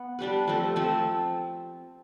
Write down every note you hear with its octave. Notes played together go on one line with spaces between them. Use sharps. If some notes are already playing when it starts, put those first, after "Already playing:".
Already playing: B3
G3 D4 G4 B4
F3 A3 C4
F3 A3 C4